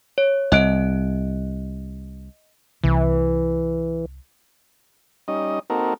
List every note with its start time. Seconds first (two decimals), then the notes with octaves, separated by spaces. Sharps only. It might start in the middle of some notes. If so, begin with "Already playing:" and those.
0.18 C#5
0.52 C2 D#5 F#6 D7
2.84 C2 E3
5.28 G3 C#4 D#4 D#5
5.70 A#3 C4 D#4 F#4 A4 A#4